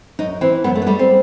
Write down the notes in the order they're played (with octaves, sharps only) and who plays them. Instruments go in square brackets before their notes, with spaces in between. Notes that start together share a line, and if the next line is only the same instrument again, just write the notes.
[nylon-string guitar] F#2 D#4
E3 C4
F#2 B3
A3
B3
G3 A3
C4